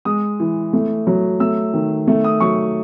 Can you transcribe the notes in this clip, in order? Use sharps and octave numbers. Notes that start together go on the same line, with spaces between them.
G#3 D#6
E3
A3
F#3
A3 E6
D#3
A3
D#6
F#3 C#6